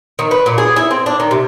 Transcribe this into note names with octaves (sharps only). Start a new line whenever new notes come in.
D#3
B4
A#2
G#4
E4
C4
D4
D#3
C3